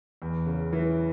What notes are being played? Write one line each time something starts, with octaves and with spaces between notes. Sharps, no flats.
E2
C#3
E3